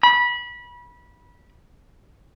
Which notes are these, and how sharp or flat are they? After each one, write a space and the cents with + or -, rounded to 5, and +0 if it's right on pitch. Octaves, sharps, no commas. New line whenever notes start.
B5 -25